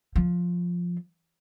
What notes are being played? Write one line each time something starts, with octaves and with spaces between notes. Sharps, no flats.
F3